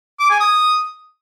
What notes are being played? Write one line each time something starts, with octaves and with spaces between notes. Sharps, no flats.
D6
G#5
D#6